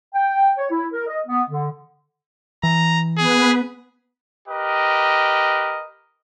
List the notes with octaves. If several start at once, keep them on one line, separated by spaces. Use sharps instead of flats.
G5
C#5
E4
A#4
D#5
B3
D3
E3 A#5
B3 G#4 B4
G4 A#4 B4 D#5